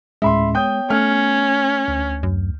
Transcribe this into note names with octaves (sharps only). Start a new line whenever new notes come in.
D2 A2 G#3 C#4 E5 B5 C6
B3 C#5 G5 D#6 G6
A3 C#4 F6
D2
F#2